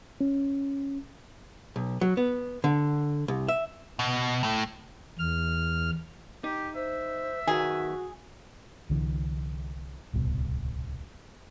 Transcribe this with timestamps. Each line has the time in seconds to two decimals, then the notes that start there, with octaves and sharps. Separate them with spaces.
0.21 C#4
1.76 B1
2.01 F#3
2.17 B3
2.64 D3
3.28 C2
3.48 E5
3.99 B2
4.43 A2 A3
5.19 E2 F6
6.44 D#4 G4
6.75 C5 E5
7.47 B1 D#3 F#4 G#4
8.90 C2 D3 E3
10.13 D1 C2 B2